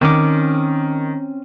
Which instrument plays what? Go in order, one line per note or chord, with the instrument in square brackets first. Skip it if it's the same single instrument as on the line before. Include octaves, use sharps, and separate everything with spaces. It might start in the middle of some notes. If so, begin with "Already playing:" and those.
[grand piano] D#3 [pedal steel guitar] C4 C#4 D6